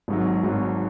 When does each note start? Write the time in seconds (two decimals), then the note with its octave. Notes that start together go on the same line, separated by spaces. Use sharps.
0.08 G#1 G#2 F#3
0.43 G#1 G#2 F#3